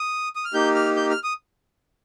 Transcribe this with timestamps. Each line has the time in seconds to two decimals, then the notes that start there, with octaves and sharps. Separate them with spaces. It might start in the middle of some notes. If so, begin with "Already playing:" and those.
Already playing: D#6
0.35 D#6
0.45 F6
0.54 A#3 D#4 G4 G6
0.75 F6
0.96 G6
1.10 F6
1.24 D#6